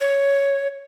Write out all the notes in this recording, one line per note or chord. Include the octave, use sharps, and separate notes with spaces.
C#5